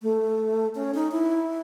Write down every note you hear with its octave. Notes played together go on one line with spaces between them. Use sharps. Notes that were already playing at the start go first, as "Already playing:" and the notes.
A3
C#4
D#4
E4